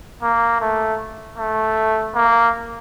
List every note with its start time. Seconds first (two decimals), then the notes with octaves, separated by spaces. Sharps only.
0.23 A#3
0.61 A3
1.38 A3
2.15 A#3